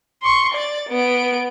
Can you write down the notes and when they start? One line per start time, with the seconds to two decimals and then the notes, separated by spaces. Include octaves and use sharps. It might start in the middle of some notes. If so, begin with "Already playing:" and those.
0.22 C6 C#6
0.54 D5 A6
0.89 B3 D7